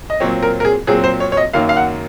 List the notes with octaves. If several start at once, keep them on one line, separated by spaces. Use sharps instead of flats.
D#5
A#2 F#3 C4 C#5
A#4
A#4
G#4
A#2 F#3 C4 G#4
C5
C#5
C#5
D#5
F#2 D#3 F#3 A#3 F5
F5
F#5